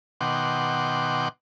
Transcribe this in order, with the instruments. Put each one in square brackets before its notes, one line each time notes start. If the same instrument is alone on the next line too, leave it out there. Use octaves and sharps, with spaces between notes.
[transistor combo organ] B2 D#3 F#5 G5 C6 D6